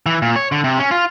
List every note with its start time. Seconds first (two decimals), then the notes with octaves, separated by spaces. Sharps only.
0.06 E3
0.22 A#2
0.36 C#5
0.52 D3
0.64 C3
0.79 C#4
0.91 F4